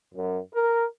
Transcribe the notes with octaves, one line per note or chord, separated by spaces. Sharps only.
F#2
A#4